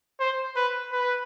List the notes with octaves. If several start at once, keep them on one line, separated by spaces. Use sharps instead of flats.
C5
B4
B4